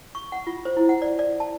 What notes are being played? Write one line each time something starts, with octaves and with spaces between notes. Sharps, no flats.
C#6
F#5
F4
C5
E4
F#5
D5
D5
A5